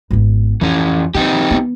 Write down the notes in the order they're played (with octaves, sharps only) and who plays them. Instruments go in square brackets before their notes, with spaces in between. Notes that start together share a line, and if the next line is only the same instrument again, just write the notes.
[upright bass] G#1 B3
[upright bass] F2 [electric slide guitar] E3 C#4
[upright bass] E3 [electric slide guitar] C4 D#4 G4
[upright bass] B3